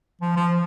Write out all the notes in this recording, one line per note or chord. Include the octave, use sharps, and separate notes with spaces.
F3
F3